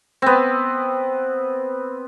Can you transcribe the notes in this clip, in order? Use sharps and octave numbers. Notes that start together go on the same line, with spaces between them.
B3 C4